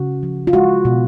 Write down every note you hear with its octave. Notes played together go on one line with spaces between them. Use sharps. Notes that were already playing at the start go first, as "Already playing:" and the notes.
Already playing: C#3 F#4
F3
F4
G#3 F#4
B2